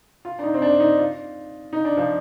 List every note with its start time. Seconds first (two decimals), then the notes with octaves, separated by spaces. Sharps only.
0.25 F4
0.39 D4
0.43 D#4
0.54 C4
0.62 D4
0.80 D#4
0.99 F4
1.73 D#4
1.85 D4
1.97 F3